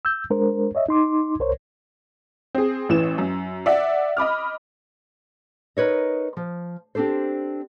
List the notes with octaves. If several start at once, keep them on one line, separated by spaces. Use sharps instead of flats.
E6 G6
G#3 D4 A#4 C5
C#5 D#5 E5
D#4 C6 D6
C2 A#4 C5 C#5
C4 G#4
A1 E3 E7
F#2
D5 E5 F#5
D#5 B5 D6 F6
D#4 A#4 B4 C#5 D#5
F3
C4 D4 G4 A4 C5